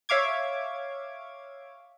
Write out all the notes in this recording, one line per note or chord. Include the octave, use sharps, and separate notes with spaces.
C#5 E5 F5 D6 G#6